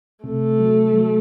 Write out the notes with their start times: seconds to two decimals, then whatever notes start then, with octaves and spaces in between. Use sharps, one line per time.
0.24 C3 A3
0.59 F#3
0.94 F#3